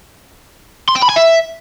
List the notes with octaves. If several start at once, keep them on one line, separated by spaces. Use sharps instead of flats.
C6
G5
B5
G#5
E5